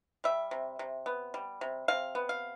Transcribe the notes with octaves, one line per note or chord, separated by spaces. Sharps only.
G3 E5
C3
C3
B3
G3
C3
C3 F5
B3
F5